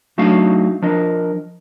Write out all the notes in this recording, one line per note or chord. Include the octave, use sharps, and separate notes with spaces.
F#3 A3 D4 D#4 F#4 F5
F3 D4 A#4 D#5